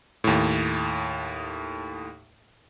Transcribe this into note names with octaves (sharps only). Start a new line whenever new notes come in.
D#2 A2